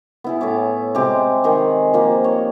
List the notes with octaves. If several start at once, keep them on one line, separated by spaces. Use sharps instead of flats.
B3 E4 G#4
A2 C#5 D6
C3 G#3 G4 D6
D#3 D#4 G#4
F3 A#3 G4
C#5 D#5